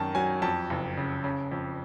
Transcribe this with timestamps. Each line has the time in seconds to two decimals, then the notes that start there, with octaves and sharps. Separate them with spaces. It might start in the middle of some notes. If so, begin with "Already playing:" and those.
Already playing: F#2 D#3 A5
0.15 F#3 G#5
0.42 F2 A5
0.70 F#1
0.97 C#3
1.24 C#3
1.52 F2